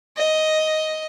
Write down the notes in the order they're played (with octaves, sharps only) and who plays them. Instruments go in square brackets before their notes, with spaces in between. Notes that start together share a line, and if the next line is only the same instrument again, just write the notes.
[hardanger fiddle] D#5